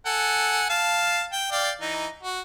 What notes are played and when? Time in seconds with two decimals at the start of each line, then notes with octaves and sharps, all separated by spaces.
0.06 A4 F#5 G#5
0.70 F5 A5
1.33 G5
1.52 D5 F5 G5
1.81 E3 D#4
2.23 F#4